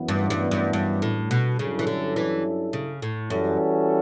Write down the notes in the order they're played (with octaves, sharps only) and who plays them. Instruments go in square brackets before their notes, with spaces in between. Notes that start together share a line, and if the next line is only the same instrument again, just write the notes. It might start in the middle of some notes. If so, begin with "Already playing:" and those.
Already playing: [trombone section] F#2 E3 B3
[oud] G2
G2
G2
G2
A2
B2
[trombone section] G2 F#3 C#4 E4 A4 [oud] C#3
[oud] E3
D3
E3
C#3
A2
[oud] F#2 [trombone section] E3 G3 C#4 F#4 A4